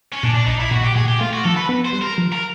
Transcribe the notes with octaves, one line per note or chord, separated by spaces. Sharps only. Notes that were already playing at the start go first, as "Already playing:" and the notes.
C#4
A#2 D4
D4
A#1 D#4
E4
A#2 F#4
G4
A#2 G#4
G4
A3 F4
F#4
F3 A4
B4
B3
C5
G3
A#4
F3
A#4